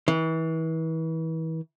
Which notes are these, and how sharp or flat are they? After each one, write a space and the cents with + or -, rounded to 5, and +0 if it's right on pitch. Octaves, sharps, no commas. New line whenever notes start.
E3 -35